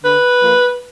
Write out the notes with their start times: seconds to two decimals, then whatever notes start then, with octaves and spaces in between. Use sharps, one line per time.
0.03 D3 B4
0.41 F3 A#3